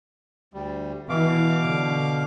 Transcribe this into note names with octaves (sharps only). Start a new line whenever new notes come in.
D2 G3
B2 E3 F5 D6
D3